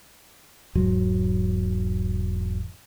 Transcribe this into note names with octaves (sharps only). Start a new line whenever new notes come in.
E1 G#2 F#3